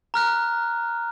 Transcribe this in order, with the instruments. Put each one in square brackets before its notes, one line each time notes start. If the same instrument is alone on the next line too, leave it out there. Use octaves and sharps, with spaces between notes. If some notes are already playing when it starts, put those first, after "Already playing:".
[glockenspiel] A#5 F6 F#6